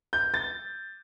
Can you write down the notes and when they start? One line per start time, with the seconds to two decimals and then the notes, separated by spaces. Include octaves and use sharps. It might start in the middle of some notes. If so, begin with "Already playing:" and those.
0.13 G6
0.34 A6